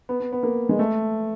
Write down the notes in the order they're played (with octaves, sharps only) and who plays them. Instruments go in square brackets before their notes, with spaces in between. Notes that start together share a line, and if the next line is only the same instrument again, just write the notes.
[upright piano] B3
B3
B3
A#3
G#3
A3